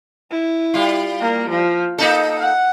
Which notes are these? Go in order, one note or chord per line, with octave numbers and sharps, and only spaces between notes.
E4
G3 F4
A#3
F3
A#3 D#4 A4 D#5
F#5